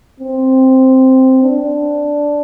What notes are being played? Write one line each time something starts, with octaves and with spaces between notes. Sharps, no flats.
C4
D4